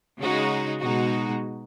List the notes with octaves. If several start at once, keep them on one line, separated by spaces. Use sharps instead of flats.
C#3 G#3 D#4 F#4
B2 G#3 D#4 F#4